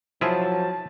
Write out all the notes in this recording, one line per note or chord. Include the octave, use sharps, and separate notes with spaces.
F3 F#3 E4 F4 G#4 A5